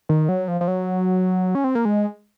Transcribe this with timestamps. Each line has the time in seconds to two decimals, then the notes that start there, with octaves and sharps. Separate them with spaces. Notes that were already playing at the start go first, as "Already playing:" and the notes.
0.09 D#3
0.29 F#3
0.48 F3
0.61 F3
0.68 F#3
1.55 C#4
1.64 C4
1.75 A#3
1.85 G#3